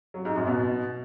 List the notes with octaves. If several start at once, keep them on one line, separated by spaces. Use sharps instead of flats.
F#3
G#2
F#2
B2